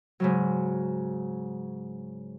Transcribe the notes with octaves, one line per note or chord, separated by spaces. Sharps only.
G#2 C#3 F#3